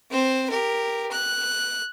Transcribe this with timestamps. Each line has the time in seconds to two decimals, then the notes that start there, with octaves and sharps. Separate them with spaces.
0.11 C4 C5
0.50 G4 A#4
1.12 F#6